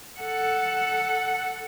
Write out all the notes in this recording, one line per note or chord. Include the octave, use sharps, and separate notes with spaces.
A4 F#5